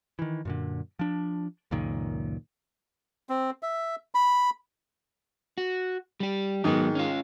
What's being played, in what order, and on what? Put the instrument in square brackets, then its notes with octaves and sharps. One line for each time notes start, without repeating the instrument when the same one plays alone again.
[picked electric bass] D#3 E3
F#2 A#2 D3
F3 D4
C#2 F#2 A#2 D#3
[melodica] C4
E5
B5
[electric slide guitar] F#4
G3 G4
[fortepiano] G#2 D#3 [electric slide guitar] F#3 B3
[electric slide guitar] C#4 F4